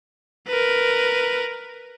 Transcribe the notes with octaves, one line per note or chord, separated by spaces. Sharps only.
A#4 B4